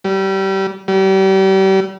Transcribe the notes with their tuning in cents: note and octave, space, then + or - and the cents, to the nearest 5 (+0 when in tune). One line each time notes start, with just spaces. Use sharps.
G3 -25
G3 -35